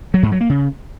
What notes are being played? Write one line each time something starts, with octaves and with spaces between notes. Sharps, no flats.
F#3
G#2
F#3
A#3
C#3